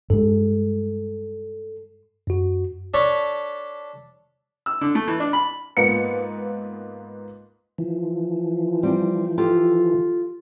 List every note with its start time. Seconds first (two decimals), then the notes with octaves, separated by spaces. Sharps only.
0.10 G2 G#3 A4
2.27 F#2 F#4
2.94 D4 A4 C#5 B5
4.66 E6
4.81 D3
4.95 A3
5.08 E3
5.20 D4
5.33 B5
5.77 G#2 A#3 B3 F4 B4 C#7
7.78 E3 F3
8.83 G3 C4
9.38 F4 G4 A4